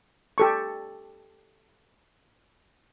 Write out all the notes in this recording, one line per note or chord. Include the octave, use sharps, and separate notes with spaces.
G4 A4 C#6